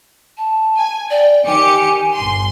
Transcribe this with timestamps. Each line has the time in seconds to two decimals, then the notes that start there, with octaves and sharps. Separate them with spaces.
0.38 A5
0.76 G#5
1.10 D5 G5
1.46 D#3 G4 G#5 C#7
2.13 G1 C6